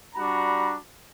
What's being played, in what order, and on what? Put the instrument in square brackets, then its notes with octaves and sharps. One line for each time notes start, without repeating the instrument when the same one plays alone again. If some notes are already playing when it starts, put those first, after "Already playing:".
[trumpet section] G3 D4 F#4 A#5 B5